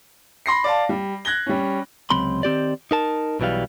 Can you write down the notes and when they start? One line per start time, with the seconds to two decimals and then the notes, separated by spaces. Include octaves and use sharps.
0.46 B5 C6 A#6 C7
0.64 D5 F5 A5
0.89 G3
1.25 F#6 G#6 A#6 G7
1.46 G3 C#4
2.10 C#2 C3 F#3 C4 B5 C6
2.43 D#3 C4 G4 D5
2.91 D#4 A#4 A5
3.40 B1 B2 E3 G3 F5